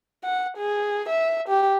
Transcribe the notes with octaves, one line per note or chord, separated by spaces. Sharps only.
F#5
G#4
E5
G4